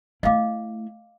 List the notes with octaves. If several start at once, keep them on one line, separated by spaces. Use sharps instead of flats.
A3 E4 D#5 F5 D6